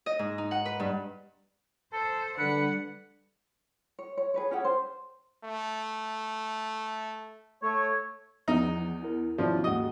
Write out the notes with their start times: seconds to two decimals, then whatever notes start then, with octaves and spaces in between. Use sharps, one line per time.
0.06 D#5
0.19 G#2
0.38 D#4
0.51 F#5
0.65 B4
0.80 G2
1.93 A4 C5
2.38 D3 G3 B4 F#5 C#7
3.99 C#5
4.17 C#5
4.34 G#4 B4 C#5
4.51 C#4 G4 G#4 F#5
4.64 C5
5.45 A3
7.62 A3 C#5
8.48 E2 F3 B3 D#4
9.03 E4 A#4
9.38 B1 D#3 F3 C#4 E4 D5
9.64 D#2 G#2 F#4 D#5 F#5